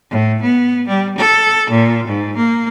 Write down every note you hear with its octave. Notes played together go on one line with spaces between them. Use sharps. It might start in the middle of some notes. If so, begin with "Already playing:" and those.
A2
B3
G3
A4
A#2
G#2
A#3